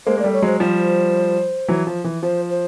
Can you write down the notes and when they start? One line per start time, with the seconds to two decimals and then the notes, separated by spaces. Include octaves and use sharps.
0.06 G#3 A#3 C5
0.18 A#3 D5
0.24 G3 A3
0.33 C#5
0.42 F#3 G#3 C5
0.60 F3 G3 C5
1.68 E3 F#3
1.87 F3
2.04 E3
2.23 F3 C5
2.50 C5